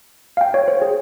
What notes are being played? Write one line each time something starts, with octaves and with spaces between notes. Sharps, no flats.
F5
G5
C#5
C5
G#4